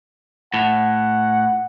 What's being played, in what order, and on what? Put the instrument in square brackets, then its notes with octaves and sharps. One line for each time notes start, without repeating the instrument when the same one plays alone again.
[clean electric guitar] A2 [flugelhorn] F#5